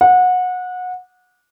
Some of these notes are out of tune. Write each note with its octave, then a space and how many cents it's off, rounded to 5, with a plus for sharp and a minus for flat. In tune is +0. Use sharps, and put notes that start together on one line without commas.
F#5 -25